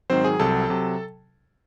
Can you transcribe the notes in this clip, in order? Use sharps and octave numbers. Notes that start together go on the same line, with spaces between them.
G#2 D#3 F#3 C4 C5
G#4 G#5
C2 C3 F#3 A4 A5
C3 F#3